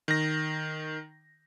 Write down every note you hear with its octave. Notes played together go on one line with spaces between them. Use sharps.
D#3 A#6